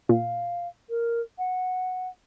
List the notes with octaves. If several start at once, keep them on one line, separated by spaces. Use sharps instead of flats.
A#2 F5
A#4
F#5